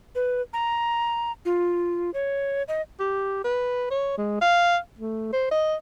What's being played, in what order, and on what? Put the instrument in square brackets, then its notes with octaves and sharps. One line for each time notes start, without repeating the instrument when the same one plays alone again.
[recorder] B4
A#5
F4
C#5
D#5
[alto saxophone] G4
B4
C#5
G#3
F5
A3
C5
D#5